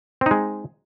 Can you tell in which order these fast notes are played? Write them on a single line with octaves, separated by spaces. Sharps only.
C4 D#4 G#3